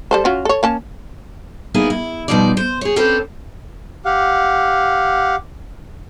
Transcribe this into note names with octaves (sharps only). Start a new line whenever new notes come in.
G3 A4 C5
C#4 F4 F#4
A4 C#5
A#3 C#4 A5
A#3 B3 D#4 E4 G#4
E4
B2 D3 F3 G3 D#4 D5
C5
G#4 C#5
C4 C#4 A4 B4 C5 D5
G4 F5 F#5